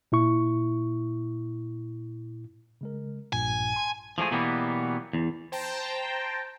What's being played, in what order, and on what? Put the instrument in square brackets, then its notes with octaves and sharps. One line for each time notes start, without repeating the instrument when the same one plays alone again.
[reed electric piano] A#2 E4 C#6
[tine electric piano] C#3 G#3 A#4
[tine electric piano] A#1 G2 A#2 [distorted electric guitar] G#5
[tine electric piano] A5 C6
[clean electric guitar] F3 G#3 A3 G#4
B2 E3 F#3 G3 A#3 B3
E2
[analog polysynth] C5 G5 A5 A#5